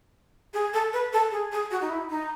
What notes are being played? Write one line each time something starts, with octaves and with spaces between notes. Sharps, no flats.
G#4
A4
B4
A4
G#4
G#4
F#4
D#4
E4
D#4